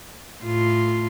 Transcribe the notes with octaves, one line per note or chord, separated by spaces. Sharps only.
A2 F4